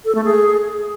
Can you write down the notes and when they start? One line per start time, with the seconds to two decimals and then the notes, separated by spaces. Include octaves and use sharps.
0.05 A4
0.15 A3
0.24 G#4